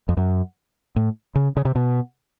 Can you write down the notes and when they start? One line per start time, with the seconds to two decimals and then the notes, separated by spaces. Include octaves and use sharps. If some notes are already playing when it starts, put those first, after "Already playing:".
0.09 F2
0.17 F#2
0.96 A2
1.35 C#3
1.57 C#3
1.65 C3
1.75 B2